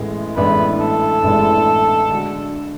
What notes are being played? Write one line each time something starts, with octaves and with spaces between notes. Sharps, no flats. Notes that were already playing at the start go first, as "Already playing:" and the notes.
Already playing: A1 A2 G#3 B3
A1 A2 G#3 B3 D4 B4
A4
A1 A2 G#3 B3 D4
D3 G#3 D4 F#4